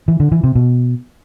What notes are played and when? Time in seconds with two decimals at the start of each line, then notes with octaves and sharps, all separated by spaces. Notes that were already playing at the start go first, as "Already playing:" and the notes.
0.08 E3
0.20 D3
0.32 E3
0.44 C3
0.55 B2